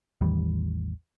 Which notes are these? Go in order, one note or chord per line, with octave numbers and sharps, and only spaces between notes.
A1 E2 D#3 G3